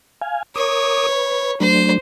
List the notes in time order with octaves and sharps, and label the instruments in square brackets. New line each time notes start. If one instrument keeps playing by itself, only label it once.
[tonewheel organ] F5 G#5
[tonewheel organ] A#4 D6 D#6 [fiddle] C#5
[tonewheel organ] B4
[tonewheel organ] F#3 A3 D4 [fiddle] C5